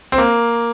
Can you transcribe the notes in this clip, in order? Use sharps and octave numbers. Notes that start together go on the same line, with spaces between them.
C4
A#3